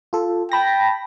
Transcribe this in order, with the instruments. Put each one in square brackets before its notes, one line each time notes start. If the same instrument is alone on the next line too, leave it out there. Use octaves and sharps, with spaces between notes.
[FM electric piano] F4 A4
[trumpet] G5 [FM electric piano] A5 B5 A#6